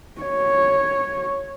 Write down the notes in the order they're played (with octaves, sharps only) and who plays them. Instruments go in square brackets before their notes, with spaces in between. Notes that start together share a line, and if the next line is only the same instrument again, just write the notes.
[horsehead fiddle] C#5